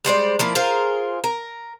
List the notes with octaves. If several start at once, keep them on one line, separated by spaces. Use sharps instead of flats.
G3 G#3 C5 D5
F3 A#3 E4
F4 G#4 A#4 C5
A#4